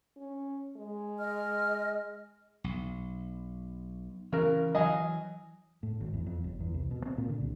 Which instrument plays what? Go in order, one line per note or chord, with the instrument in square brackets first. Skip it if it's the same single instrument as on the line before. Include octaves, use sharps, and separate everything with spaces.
[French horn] C#4
G#3
[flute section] D#5 F6
[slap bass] B1
[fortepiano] C#3 A#4 [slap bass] E3
[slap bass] E3 F#3 [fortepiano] D#5 F5 G#5
[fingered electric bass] A2
G#1
E2
F2
G1
E2
C2
B2
C4
A#2
D3
C2